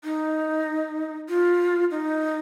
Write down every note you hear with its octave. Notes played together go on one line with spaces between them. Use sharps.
D#4
F4
D#4